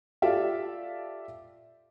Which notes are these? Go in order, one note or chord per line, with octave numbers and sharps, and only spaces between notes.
F4 G4 A4 D5 E5 F5